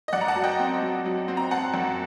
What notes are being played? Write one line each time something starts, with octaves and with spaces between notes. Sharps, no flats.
D#5
F#2 D5 F#5
A#5
F#5 A5
F#3
D#5 G5
C4
F#3
F#3
C4
A#5
C4 F#5 A5
F#2